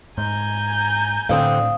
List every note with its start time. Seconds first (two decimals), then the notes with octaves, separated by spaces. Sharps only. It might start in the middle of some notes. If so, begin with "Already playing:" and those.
0.18 G#2 G#5 A#5 G6
1.29 A2 D3 C4 D4 C5 F5 D#6